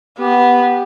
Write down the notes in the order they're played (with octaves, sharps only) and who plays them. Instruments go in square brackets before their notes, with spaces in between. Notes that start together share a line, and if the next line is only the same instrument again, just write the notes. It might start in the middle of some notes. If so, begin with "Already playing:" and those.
[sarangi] B3 [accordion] G4